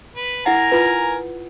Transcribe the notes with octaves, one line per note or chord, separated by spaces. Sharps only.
B4
E4 A#4 F#5 G#5 A#5
F4 B4